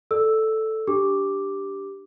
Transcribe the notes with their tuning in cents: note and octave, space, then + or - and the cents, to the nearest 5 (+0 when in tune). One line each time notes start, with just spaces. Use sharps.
A4 +0 D5 +15 E6 +0
D4 +0 G4 +0 D6 +0